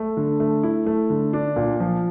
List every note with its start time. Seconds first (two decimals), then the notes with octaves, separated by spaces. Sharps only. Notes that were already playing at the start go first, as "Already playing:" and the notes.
Already playing: A3
0.17 D3
0.40 A3
0.63 E4
0.86 A3
1.10 D3
1.33 D4
1.56 A#2
1.80 F3